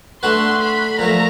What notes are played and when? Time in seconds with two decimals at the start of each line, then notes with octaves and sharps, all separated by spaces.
0.23 A3 D4 F#4 B4 C6
0.61 B5
0.99 A#2 F3 A3 A#5